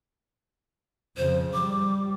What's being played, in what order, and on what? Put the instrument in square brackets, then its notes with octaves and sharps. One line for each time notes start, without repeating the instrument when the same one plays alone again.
[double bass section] F2 C#3 F3 [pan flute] C5
[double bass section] G3 [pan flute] D6